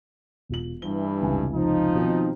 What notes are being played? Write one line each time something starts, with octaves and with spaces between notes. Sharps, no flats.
E1 F4 F#7
G2 E3 G7
F1 C#2 G#5
F3 D#4
B2 D#3 C4